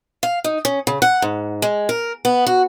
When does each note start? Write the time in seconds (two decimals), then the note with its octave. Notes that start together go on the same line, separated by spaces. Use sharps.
0.23 F5
0.44 D#4
0.65 C#4
0.87 C#3
1.02 F#5
1.22 G#2
1.62 G#3
1.89 A#4
2.25 B3
2.47 F#4